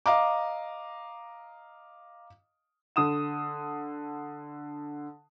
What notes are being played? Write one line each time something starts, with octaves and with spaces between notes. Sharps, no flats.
D#5 F5 A#5 D6
D3 D#6 E7